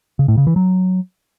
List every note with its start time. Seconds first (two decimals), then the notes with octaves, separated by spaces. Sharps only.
0.19 C#3
0.28 A2
0.38 C#3
0.47 E3
0.56 F#3